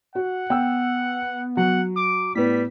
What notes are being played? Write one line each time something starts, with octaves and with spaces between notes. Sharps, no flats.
F#4 F#5
B3 G5 E6
F#3 F#5
D6
A2 G3 B3 B6